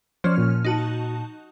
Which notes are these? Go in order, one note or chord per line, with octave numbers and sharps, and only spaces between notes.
F3 C#4 C5 D5 F6
A#2
D#4 F#4 A5